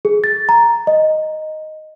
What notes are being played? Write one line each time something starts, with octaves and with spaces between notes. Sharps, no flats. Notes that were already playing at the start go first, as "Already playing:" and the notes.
G#4
A6
A#5
D#5